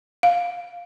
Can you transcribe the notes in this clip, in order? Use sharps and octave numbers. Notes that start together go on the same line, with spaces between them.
F5